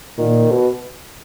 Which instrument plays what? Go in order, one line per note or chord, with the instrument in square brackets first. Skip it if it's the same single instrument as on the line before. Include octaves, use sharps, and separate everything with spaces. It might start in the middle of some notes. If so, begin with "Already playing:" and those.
[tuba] A#2 [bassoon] D#3
[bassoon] B2